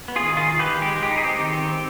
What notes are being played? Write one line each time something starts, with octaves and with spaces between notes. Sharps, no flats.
B3
F4 G#4
D#3
D#3 F4 G#4
D#3
G4 B4
D#3
G#3 G4
G#3
G4
D#4
G#4
C4 G4
D#3
C4
C4